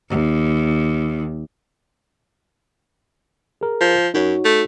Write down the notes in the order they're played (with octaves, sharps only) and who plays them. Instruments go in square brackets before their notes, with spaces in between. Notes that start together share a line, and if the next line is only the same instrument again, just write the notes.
[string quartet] D#2
[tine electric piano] G#4 A#4
[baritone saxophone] F3
[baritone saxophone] F#2 [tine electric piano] D#4 F#4 C#5
[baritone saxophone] A3